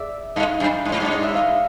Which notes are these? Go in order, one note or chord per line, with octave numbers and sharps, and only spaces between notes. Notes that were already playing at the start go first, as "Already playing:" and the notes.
Already playing: G#4 D5 E5
G2 D#5 F5
F#2
G2
G#2 C#5
G2 D5
D#5
E5
D#5 F5